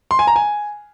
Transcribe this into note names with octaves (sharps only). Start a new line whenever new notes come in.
C6
G#5
A#5
G#5